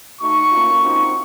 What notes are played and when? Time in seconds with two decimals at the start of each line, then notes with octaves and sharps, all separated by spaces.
0.21 A3 D#4 F#4 C#6
0.51 A#3 C#4 F4
0.81 C4 D#4 F#4